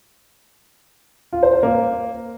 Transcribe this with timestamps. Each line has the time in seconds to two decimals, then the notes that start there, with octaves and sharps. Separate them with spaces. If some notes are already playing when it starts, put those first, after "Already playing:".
1.33 F4
1.43 C5
1.53 C5
1.63 A#3